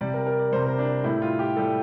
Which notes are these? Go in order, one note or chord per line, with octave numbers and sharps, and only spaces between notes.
C3 G3 D5
A#4
A#4
D5
C3 G3 C5
A#4
D4
A2 G3 E4
F4
G4
A2 G3 A4